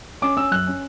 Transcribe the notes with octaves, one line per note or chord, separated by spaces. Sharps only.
C#4 D6
C#4 E6
F#2 F#6
C#4